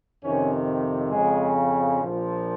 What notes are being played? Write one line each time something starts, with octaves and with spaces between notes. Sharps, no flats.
F2 C3 D#3 C#4
F2 C#3 F3 G#3
A#1 A#2 F3